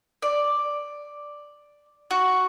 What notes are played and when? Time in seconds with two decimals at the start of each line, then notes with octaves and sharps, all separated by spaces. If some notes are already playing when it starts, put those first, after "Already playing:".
0.22 D5
2.11 F#4